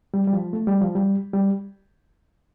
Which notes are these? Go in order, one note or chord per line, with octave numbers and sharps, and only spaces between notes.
G3
G3
F3
A3
G3
F3
G3
G3